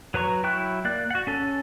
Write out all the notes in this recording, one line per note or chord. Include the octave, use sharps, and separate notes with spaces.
F#3 B4 A#5 C#6
F#3 E4 G5 C#6 F#6
A#3 D5 F#6
F#4 F#5
C#4 A4